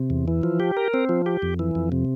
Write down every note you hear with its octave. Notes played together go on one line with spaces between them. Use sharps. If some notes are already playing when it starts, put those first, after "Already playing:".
Already playing: C3
E2
E3
F3
G4
A#4
C4
F3
G4
F2
E3
F2
C3